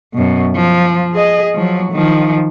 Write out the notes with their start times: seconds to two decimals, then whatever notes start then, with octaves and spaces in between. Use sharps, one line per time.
0.14 F#2 B2
0.56 F3
1.13 G#4 D#5
1.55 F3 F#3
1.92 D#3 F3